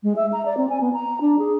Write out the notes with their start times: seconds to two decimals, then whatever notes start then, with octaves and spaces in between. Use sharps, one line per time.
0.03 G#3
0.16 E5
0.33 A#5
0.46 D5
0.57 C4
0.70 G#5
0.81 B3
0.93 A#5
1.21 D4
1.39 G#4